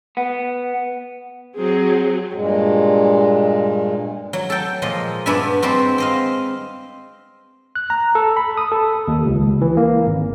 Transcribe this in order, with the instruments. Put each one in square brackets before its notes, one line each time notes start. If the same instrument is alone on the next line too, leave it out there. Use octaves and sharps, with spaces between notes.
[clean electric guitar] B3
[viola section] F#3 C4 G#4
[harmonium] G2 A#2 G#3
[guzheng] F#3
A4 G5
A#2 F3 G#3 D#5
G2 B3 D4 D5 E5 G#5
G3 G#3 C4 F#4
C4 D#5 F5
[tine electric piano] F#6
A#5
A4
B5
D#6
A4
D#2
C#2
E3
A#3
G#1